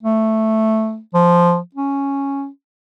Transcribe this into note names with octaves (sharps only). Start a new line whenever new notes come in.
A3
F3
C#4